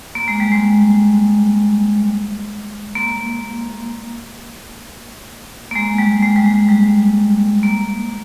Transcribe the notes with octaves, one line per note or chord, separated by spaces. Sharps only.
A#3
G#3
G3
G#3
A#3
A#3
G#3
G3
G#3
G3
G#3
G3
A#3